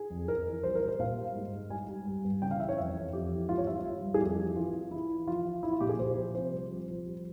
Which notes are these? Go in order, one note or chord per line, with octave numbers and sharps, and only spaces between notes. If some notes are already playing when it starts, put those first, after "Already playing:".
Already playing: G#4
F2
F2 A#4
E3
G3 C5
A#4
G3
C5
A#2 F5
G3
G#2
G#2
G3 G#5
G3
G2
G2
C#3 G5
F5
E3 E5
C#5
F2 E5
F2
F2 G4
E3
G#2 F4
C#5
G3 E5
F4
G3
G2
G#4
F2 G4
E3
E3 F4
E3
E3 E4
E3
F3 F4
F3
F3 E4
F4
A#2 G4
G#4
A#2 C5
F3
C3 C5
G3
F3
F3
G3